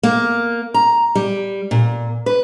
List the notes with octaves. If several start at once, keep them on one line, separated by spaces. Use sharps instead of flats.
A#3
A#5
G3
A#2
B4